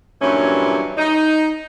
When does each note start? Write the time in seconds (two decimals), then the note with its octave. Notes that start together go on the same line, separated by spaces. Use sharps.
0.20 G2 A#2 E3 F#3 G3 C#4
0.97 D#4